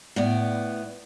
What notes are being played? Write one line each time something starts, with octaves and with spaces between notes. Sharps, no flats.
A2 B3 D5